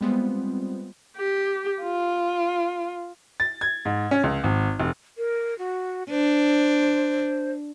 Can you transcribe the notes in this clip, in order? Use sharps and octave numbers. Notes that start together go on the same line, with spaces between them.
G3 G#3 B3 C4 F4 C5
G4
F4
A6
G#6
G#2
C#4
C#2
G#1
F1
A#4
F#4
D4 C5